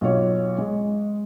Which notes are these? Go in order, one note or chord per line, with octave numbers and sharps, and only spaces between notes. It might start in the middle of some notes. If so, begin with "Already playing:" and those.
B1 F4 C#5
G#3